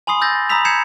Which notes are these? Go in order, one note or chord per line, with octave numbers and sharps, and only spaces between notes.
G#5 B5 C6 D#6 C7
E6 G6 A6 A#6
A#5 B5 D#6 E6 B6 F7
A#5 G6 G#6 C7 C#7 E7